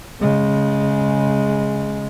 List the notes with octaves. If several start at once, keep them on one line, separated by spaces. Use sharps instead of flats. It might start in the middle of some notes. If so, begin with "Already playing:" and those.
C#3 G#3